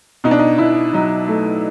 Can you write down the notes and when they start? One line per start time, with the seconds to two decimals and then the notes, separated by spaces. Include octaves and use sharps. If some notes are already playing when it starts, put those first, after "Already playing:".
0.24 B2 D#4
0.31 D4
0.39 D#4
0.58 B2 E4
0.93 F#3 D#4
1.28 A3